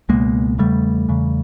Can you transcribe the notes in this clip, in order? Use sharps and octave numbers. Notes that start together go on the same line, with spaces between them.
C#2 B2 G#3 A#3
E2 C#3 G3 A3
E2 C#3